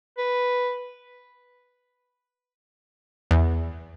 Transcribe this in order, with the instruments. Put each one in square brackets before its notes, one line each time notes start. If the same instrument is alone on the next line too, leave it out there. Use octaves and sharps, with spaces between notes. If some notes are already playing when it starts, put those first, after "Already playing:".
[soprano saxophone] B4
[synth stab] E2